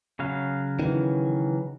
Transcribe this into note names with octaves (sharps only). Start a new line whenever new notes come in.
C#3 F#3 F5
D#3 E3